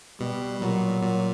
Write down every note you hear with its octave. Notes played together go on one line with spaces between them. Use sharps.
B2 G3
A#2 F#3
A#2